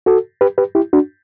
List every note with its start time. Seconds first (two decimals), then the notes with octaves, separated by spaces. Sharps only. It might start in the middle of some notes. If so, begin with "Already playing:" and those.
0.06 F#4 A4
0.41 G4 B4
0.58 G4 B4
0.75 E4 G4
0.93 D4 F#4